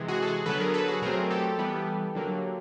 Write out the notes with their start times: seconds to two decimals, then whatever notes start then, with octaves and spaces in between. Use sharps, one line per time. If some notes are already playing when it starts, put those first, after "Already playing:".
Already playing: C3 E3 G#3
0.08 F#4 G#4
0.23 A4
0.27 F#4 G#4
0.46 D3 F#3 B3 A4 B4
0.60 G#4 A#4
0.74 A4 B4
0.88 F#4 G#4
1.02 B2 F#3 A3 C4 G#4 A#4
1.30 G4 A4
1.58 E3 G3 B3
2.15 D3 F#3 A#3